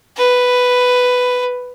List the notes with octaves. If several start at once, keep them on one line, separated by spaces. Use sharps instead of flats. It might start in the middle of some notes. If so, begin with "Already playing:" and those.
B4